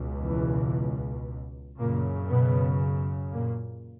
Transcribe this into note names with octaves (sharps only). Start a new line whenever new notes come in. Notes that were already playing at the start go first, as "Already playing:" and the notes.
Already playing: C#2 B2
E2 E3
F#2 A#2 C#3 A#3
B2 B3
A#2 A#3